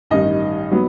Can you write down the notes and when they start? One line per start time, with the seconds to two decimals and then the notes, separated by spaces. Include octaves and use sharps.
0.10 A1 G2 D#3 D#4 D#5
0.71 F#3 B3